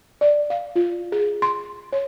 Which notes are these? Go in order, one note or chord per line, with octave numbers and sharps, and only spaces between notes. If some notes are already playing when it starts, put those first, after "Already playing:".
D5
F5
F4
G#4
C6
C#5